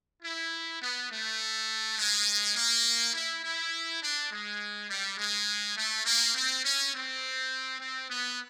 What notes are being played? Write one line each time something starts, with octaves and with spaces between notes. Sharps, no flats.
E4
B3
A3
G#3
A#3
E4
E4
D4
G#3
G3
G#3
A3
A#3
C4
C#4
C4
C4
B3